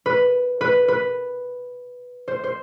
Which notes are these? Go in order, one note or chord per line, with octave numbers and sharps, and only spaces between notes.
B4
B4
B4
C5
C5